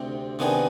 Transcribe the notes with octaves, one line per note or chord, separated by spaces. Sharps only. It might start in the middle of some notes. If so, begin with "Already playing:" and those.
Already playing: D2 C3 C4 G4
C3 D#3 B3 D4 G#4